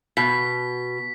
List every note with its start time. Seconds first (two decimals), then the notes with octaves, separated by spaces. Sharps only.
0.17 B2 B6